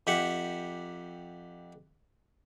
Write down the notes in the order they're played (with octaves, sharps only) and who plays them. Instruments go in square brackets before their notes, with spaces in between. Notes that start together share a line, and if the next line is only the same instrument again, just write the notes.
[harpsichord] F2 G4 E5 F#5